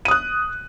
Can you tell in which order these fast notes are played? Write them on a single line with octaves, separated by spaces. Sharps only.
D#7 D#6 F#6